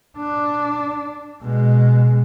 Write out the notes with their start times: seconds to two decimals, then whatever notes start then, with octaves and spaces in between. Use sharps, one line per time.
0.17 D4
1.42 B2 G#3